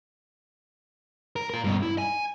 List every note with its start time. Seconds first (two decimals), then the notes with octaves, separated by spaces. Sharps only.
1.36 A#4
1.50 F4 A#4
1.64 G2 B2
1.83 E4
1.98 G#5